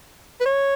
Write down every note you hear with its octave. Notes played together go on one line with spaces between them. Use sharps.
B4
C#5